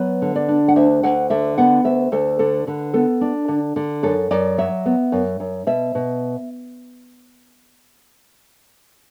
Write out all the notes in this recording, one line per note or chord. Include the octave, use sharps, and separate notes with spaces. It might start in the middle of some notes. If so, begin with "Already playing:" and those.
Already playing: F#3 B3 B4
D3
D5
D4
F#5
D2 E5
D2 F#5
D3 E5
B3 F#5
D2 E5
D2 A4
D3 A4
D3 B4
B3 A4
D4
D3
D3
F#2 A4
F#2 D5
F#3 E5
B3
F#2
F#2
B2 E5
B2